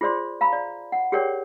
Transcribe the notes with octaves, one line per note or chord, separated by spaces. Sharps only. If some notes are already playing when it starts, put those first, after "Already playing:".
F4 G#4 C5 D5 C6
F5 A#5 B5
D5
F#5
G4 G#4 A#4 C#5 D5 G5